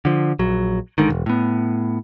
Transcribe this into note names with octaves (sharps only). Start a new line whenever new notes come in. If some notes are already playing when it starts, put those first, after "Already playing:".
D3 F3
A#1 F#3
G#1 G#2 D3 D#3
E1
A2 B3